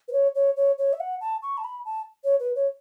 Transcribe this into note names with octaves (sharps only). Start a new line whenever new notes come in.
B4
C#5
C#5
C#5
C#5
E5
F#5
A5
C#6
A5
B5
A5
C#5
B4
C#5